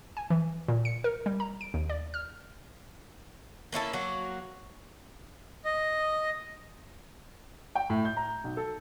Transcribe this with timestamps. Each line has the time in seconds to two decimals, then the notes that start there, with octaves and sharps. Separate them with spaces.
0.17 G#5
0.30 E3
0.68 A#2
0.85 C#7
1.04 A#4
1.26 G3
1.40 A#5
1.61 D7
1.74 D#2
1.90 D5
2.14 F6
3.72 A#3 C#4 E4 A4
3.93 F#3 A#3 F#4
5.65 D#5
7.75 G5
7.90 A2
8.05 G6
8.17 A#5
8.44 B1
8.57 A4